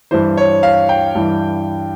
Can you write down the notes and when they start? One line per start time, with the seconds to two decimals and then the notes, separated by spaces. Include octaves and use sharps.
0.11 G2 E3 C5
0.37 C#5
0.63 F5
0.89 G5
1.15 G2 E3